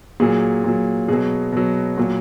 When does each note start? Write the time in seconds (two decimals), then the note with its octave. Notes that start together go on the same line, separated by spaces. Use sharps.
0.20 A#2 F#3 G#4
0.64 A#2 F#3
1.08 B2 F#3 G#4
1.52 B2 F#3
1.98 A#2 F#3